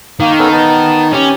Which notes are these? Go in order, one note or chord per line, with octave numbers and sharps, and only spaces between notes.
D#3 A#3
B3 C#4 A4
B3 D#4 A5
C#4 G4